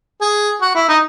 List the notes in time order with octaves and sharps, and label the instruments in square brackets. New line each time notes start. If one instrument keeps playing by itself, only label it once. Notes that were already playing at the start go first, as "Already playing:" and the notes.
[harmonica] G#4
F#4
E4
D#4